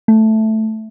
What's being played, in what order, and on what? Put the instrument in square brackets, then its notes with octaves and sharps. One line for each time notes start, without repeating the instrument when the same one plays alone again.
[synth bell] A3